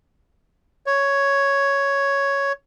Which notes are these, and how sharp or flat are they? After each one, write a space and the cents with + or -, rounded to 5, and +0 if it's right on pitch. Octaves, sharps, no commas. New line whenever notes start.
C#5 +0